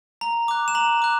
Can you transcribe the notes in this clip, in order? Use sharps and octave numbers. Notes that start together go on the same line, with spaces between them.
A#5
D6 F#6
E7
A#5 F#7
D6 F#6